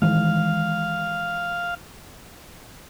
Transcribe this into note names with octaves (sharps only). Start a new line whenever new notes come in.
D#3 E3 G#3 F5